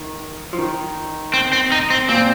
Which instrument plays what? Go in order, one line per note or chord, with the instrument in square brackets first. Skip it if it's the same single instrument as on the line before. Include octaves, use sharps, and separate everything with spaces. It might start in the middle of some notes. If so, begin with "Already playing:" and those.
Already playing: [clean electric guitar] D#3
F3
D#3
[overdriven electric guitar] C4
C4
D#4
C4
[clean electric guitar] A#2 [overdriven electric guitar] C4